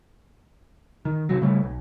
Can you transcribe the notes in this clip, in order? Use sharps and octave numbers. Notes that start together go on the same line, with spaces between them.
D#3
C3 F#3
C#3 G3 A3
B1